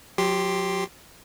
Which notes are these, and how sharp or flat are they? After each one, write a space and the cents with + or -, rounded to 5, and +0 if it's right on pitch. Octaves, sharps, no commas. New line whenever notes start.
F#3 -35 G4 +0 C6 +0